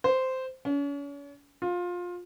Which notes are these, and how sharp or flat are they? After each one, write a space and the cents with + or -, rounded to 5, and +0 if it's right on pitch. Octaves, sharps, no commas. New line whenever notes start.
C5 -10
C#4 +40
F4 +20